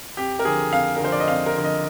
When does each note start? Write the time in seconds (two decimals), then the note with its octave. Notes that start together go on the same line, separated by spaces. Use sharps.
0.17 F2 G4
0.40 A#4
0.45 D3 F3 G#4
0.72 F2 F5
0.97 A#4
1.00 D3 F3 C5
1.12 D5
1.20 D#5
1.28 F2 F5
1.46 A#4
1.56 D3 F3
1.65 D#5